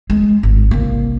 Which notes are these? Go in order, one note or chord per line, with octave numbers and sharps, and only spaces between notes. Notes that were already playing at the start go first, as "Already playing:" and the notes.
G#3
G#1
C2 A#3